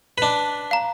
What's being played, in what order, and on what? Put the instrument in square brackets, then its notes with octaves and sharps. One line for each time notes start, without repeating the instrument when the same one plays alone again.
[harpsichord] D4 B4
[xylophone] F5 A#5